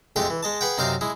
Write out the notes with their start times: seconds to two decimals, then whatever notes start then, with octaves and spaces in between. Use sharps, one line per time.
0.16 F2 G#3 A3 G4 G#4 G5
0.30 E3
0.43 G#3 D#5 A5
0.61 G#4 B4 F#5 G5
0.78 F#2 C3 D#4 C5 F5 D6
1.01 G#3 E4 G#4